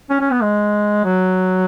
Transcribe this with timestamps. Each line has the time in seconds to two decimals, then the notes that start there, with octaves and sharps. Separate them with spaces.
0.10 C#4
0.21 C#4
0.31 B3
0.41 G#3
1.05 F#3